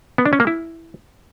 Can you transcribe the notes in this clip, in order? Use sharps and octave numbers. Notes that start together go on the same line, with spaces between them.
B3
D4
C#4
A#3
E4